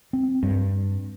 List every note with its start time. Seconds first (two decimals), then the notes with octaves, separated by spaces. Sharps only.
0.13 C4
0.43 G2